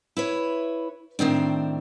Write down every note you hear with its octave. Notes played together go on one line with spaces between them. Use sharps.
E4 B4 C#5
A2 D#3 C4 D4